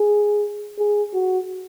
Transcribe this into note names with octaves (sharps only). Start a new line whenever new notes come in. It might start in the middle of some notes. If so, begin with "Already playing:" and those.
Already playing: G#4
G#4
F#4